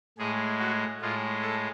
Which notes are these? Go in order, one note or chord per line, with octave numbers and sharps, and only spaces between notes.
A2 G#3 G#4
F#4
A2 G#3 F4
A4